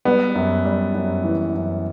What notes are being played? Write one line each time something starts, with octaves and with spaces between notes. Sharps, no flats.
G3 B3
F#2
G3
F#2
E3
F#2